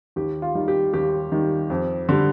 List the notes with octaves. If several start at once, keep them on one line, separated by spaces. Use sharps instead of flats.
D#2 G4
F4
D#3 G3
G4
D#2 G4
D#3 G3
F2
D3 G3